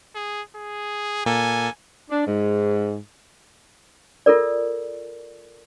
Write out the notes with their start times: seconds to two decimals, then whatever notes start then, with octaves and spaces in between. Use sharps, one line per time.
0.15 G#4
0.56 G#4
1.26 A#2 A#3 A4 G#5
2.10 D4
2.27 G#2
4.26 F4 A4 A#4 D5